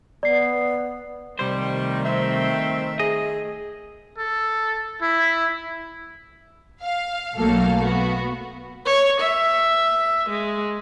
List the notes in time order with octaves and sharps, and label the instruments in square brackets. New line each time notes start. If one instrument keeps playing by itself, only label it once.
[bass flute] B3 [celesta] D5 C7
[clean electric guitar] C2 C5 [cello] D#3 A3 [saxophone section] G3
[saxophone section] C4 [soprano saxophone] E5
[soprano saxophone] G#4 [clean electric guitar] D#5
[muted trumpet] A4
E4
[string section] F5
B1 F#3 A3 A#3 A4 F5
B3 F#4
[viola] C#5
E5
G#3